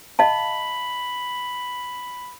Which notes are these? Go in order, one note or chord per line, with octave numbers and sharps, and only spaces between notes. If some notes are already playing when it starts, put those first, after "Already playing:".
D#5 F5 A5 B5